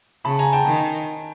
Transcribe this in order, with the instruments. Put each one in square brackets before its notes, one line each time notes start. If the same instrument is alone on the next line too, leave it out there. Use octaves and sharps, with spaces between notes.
[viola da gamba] C#3 [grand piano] A5 B5
[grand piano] G#5 A#5
G5 A5
[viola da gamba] D#3